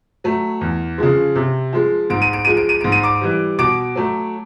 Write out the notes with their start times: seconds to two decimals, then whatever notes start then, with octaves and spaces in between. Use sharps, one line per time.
0.24 F#3 A3
0.61 E2
0.98 C#3 F3 G#3
1.35 C3
1.73 F3 G#3
2.10 G#2 D7
2.22 D#7
2.33 D7
2.45 F3 G#3 D#7
2.57 D7
2.69 D#7
2.81 G#2 D7
2.92 D#7
3.03 D6 D7
3.21 E3 G3
3.59 B2 D6 D7
3.95 F#3 A3